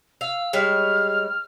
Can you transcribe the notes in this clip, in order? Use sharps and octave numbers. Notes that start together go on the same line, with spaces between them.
F5 E6
G3 G#3 C#5 F6